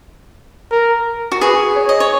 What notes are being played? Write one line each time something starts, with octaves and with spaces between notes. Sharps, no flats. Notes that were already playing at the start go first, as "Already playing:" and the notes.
A#4
F#4
G#4 B4
C#5
D#5
C#5